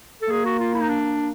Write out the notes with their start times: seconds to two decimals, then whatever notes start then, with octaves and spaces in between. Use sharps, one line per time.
0.22 A4
0.30 A#3 G#4
0.45 F#4
0.60 F4
0.74 E4
0.81 D#4
0.89 D4